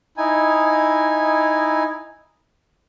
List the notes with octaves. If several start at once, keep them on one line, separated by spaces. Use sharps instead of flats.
D#4 E4 G#5